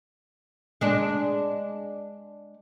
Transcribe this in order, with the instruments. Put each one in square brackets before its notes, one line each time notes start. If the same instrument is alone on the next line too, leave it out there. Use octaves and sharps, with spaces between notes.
[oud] G#3 D4